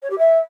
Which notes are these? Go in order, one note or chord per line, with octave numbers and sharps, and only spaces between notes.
C#5
G4
E5